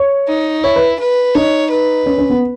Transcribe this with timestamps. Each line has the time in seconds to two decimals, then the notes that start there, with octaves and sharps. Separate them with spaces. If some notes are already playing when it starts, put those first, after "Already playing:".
Already playing: C#5
0.28 D#4
0.63 E4 C#5
0.76 B4
1.00 B4
1.34 D#4 C#5
1.71 B4
2.06 C#4
2.18 C#4
2.30 B3